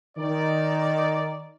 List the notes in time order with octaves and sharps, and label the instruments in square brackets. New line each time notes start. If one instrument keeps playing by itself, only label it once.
[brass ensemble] D#3 D#4 D5